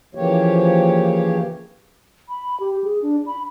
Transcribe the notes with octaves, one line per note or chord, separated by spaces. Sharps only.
C#3 E3 F3 A#3 G4 C#5
B5
G4
G#4
D4
B5